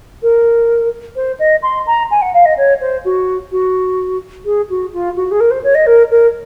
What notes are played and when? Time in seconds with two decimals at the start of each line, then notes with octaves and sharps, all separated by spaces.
0.22 A#4
1.16 C5
1.39 D#5
1.63 C6
1.87 A#5
2.11 G#5
2.22 F#5
2.34 F5
2.45 D#5
2.57 C#5
2.81 C5
3.05 F#4
3.51 F#4
4.45 G#4
4.70 F#4
4.93 F4
5.16 F#4
5.31 G#4
5.40 A#4
5.51 C5
5.64 C#5
5.75 D#5
5.87 A#4
6.11 A#4